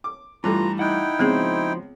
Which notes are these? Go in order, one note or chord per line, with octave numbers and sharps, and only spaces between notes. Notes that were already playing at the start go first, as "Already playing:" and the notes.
D6
G2 E3 A3 F4 A#5
D#4 E4 F#5 G5 F#6
C#2 F3 B3 C4 F#4 G#4 C5